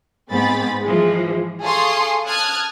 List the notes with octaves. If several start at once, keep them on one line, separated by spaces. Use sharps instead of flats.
G#2 B3 C4 G#4 B5 A6
E3 F3 G#3
G#4 A4 F5 C6 C#6 D#6
A5 D#6 F6 F#6 G#6